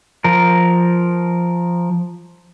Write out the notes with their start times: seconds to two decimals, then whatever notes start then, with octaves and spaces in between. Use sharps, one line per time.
0.24 F3 A#4